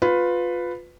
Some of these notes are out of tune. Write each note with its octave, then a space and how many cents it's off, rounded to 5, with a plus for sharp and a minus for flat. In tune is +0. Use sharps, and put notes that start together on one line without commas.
F4 +20 B4 +10